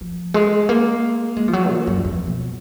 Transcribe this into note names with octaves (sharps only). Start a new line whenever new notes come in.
F3
G#3
A#3
G#3
F3
F#3
A#2
F#2
F2
B2